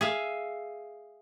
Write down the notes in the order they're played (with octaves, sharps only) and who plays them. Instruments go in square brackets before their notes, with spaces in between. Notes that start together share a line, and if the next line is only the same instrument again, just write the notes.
[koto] G#4 E5 F5